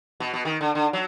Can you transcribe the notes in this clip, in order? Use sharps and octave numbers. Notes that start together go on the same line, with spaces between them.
B2
B2
D#3
D3
D3
F#3